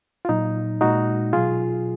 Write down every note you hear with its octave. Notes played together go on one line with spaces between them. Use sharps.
F4
A#2 F#3 D#4
A#2 G#3 D#4 F#4
B2 F#3 F4 G#4